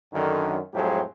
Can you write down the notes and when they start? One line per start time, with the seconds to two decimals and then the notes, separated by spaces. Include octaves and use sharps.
0.14 F#2 D3 D#3
0.75 F2 A2 F#3 G#3 G4 C5